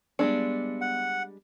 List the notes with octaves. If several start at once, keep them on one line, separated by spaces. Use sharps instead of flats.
G3 G#3 B3 D4 C#7
F#5